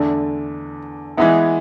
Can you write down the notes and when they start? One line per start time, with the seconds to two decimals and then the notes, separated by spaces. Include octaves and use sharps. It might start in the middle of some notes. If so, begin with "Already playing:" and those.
Already playing: E2 D3 A3 D4
1.17 E3 G#3 B3 E4